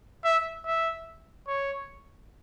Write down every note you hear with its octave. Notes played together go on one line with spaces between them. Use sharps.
E5
E5
C#5